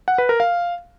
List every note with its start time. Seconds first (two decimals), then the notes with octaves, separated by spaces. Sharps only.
0.08 F#5
0.18 B4
0.29 A#4
0.40 F5